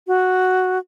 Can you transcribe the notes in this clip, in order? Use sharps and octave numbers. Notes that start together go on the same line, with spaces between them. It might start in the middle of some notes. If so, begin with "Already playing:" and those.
F#4